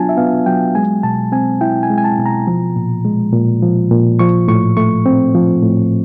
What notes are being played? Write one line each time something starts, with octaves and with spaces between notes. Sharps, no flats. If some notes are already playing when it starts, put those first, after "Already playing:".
Already playing: F#3 B3 D4 F4 G#5 A5
E5
B3 F5
F#3 G5
G#3 G#5
B2 A5
C4 G#5
E4 G5
G#5
G#3
G#5
A5
B2
A#5
F3
A#2
G#3
A#2
F3
A#2
F3 C#6
A2 C#6
A3 C#6
C4
F3
A2